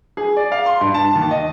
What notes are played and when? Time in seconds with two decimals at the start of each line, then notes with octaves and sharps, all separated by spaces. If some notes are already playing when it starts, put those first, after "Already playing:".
0.17 G#4
0.36 D5
0.52 F5
0.66 C6
0.81 G2
0.94 A5
1.15 D#2
1.31 D#5